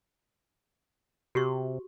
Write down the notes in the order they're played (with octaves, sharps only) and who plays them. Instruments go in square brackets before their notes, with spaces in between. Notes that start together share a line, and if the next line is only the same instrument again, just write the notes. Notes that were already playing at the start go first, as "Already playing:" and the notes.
[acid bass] C3 [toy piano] F#4 G4 C#6